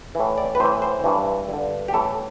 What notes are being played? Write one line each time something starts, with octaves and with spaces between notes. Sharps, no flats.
A2 E3
D5
B4
A2 E3 C5
C5
G2 E3
G2 D3
G4
A2 E3 A4